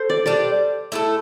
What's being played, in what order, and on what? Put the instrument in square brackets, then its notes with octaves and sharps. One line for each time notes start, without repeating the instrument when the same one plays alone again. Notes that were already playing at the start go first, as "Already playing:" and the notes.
Already playing: [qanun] A4 C5
D5
[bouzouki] G3 D4 G4 [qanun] D5
[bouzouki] A3 E4 A4